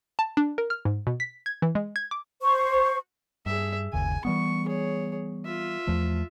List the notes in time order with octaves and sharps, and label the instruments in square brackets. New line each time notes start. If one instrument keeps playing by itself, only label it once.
[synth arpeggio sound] A5
D4
A#4
F6
G#2
B2
B6
G#6
E3
G#3
G#6
D6
[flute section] C5 C#6
[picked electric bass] G2 [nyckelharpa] G#4 E5
[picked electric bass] G1 D#2 C#3 [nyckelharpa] G#5
[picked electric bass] E3 G3 B3 [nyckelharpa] C#6
[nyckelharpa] G#4 C#5
F4 E5
[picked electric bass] E2 F3 A3